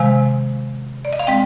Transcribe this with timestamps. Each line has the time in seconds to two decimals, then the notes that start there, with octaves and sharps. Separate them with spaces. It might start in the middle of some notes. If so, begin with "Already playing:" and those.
Already playing: C3 D#3 G#3 F5 G#5
1.05 D5
1.13 D#5
1.19 F5
1.27 G#3 C4 D#5 G5